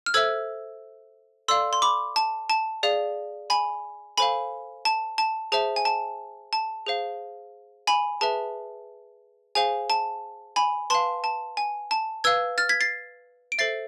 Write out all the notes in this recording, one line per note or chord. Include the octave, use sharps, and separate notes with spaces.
F6
A4 C5 E5 E6 G#6
A4 D5 F5 C6 E6
C6
B5 D6
A5
A5
G#4 D5 F5
G#5 B5
A4 C5 F5 G#5 B5
A5
A5
G#4 C5 E5 A5
G#5
A5
A5
G#4 C5 F5
G#5 B5
G#4 B4 E5 A5
G#4 C5 F5 G#5
A5
G#5 B5
B4 F5 A5 C6
A5
G#5
A5
B4 F5 E6 G#6
F6 A6
G#6 B6
A6 C7
D7
A4 C5 E5 A6 C7